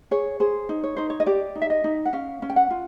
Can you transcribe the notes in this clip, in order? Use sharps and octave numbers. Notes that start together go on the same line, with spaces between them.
G#4 C#5
G#4 C5
D#4
C#5
D#4 C5
C#5
D#5
G4 D5
D#4
E5
D#5
D#4
F#5
C#4 F5
C#4
G5
F#5
F4